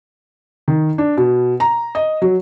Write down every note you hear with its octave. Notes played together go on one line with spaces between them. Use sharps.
D#3
D4
B2
A#5
D#5
F#3